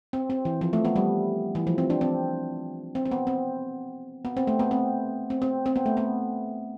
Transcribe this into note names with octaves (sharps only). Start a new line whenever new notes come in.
C4
C4
E3
F3
A3
B3
G3
E3
F3
C4
D4
C4
C4
C4
B3
C4
B3
C4
A3
B3
C4
C4
C4
C4
B3
A3
B3